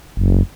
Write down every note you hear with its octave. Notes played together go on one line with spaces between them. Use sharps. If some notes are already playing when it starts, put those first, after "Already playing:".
F#1